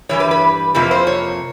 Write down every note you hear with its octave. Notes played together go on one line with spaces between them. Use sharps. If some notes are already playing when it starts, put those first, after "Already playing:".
G2 E3 G3 C#5
B4
B4
F2 C3 F3 A#3 B4
C5
C#5